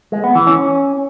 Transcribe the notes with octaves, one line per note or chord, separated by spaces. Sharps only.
G#3
B3
E3
C#4